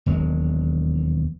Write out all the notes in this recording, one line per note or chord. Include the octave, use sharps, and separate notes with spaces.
E1 D#2 F#3 G#3